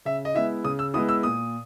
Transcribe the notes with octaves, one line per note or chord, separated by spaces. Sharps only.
C#3 E5
D#5
G#3 B3 E4 E5
C#3 D#6
E6
G#3 B3 E4 D#6
E6
A#2 D#6